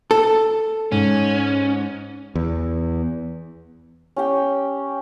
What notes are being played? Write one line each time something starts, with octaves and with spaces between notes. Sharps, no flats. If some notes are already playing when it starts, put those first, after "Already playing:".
A4
G#2 C#4
E2
C#4 G4 G5